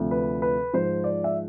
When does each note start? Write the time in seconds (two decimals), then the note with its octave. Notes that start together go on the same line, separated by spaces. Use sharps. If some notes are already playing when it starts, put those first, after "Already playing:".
Already playing: D2 C3 F3
0.11 B4
0.42 B4
0.73 G#2 F3 C5
1.04 D5
1.24 E5